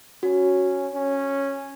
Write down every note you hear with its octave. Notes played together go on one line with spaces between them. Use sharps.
C#4 F#4
C#4